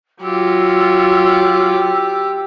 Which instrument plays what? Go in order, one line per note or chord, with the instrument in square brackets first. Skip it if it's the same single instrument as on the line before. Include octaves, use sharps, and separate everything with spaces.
[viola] F#3 F4 [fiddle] G4 [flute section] E6